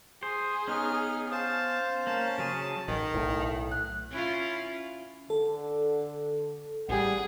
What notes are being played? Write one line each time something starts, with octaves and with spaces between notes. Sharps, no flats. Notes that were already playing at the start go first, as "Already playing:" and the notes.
G#4 C5
B3 C#4 D#4 F6
C5 F5 A5
A#3 C#4 A5
C#3 F#3 G#4
A1 D#3
B1 A2 E4
F#6
C#4 E4 F4
D3 A4
A1 G3 G#4 F#5